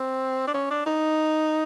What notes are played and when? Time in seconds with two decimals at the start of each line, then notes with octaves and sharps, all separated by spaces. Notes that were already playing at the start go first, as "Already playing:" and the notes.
Already playing: C4
0.47 D4
0.54 C#4
0.71 D4
0.86 D#4